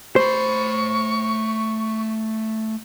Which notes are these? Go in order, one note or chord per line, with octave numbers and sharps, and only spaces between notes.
A3 C5 B5 C#6